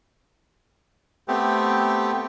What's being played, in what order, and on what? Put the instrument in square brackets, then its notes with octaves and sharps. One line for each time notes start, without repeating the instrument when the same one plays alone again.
[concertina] A3 B3 C4 G4